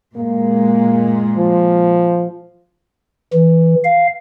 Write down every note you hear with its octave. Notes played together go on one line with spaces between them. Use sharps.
A#2 G#3 A#3
F3
E3
F5